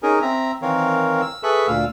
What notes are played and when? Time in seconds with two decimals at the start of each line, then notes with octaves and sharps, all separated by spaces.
0.03 C#4 D#4 G#4 A#4
0.22 C4 E5 A#5
0.62 D#3 E3 C4 A#4 C#5 F5
1.22 E6
1.43 G#4 A4 B4 E5 B5 C#6
1.68 D2 A#2 F5 E6